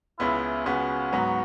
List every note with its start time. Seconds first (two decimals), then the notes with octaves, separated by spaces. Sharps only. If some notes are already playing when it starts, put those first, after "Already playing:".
0.19 C#2 C#3 G#3 B3 E4
0.66 C#2 C#3 G#3 B3 F#4
1.13 G#2 F#3 B3